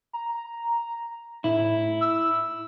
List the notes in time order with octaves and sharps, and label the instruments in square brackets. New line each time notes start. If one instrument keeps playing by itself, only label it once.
[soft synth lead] A#5
[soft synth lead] A2 [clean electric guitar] E4
[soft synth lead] E6